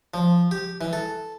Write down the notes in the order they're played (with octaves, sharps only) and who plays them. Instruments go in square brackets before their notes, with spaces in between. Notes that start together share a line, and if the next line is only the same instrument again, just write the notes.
[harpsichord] F3
G4
E3
A4